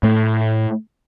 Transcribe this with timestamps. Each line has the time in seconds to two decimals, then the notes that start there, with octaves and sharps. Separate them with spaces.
0.03 A2 A3